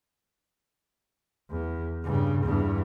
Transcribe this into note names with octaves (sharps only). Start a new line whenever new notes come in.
E2
G2 C#3
E2 G2